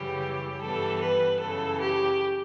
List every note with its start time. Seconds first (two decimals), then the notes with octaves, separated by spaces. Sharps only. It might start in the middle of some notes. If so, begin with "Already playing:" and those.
Already playing: F#2 C#3 E3 G3 G4
0.61 G2 E3 G3 B3 A4
1.01 B4
1.41 F#2 C#3 E3 A4
1.80 G4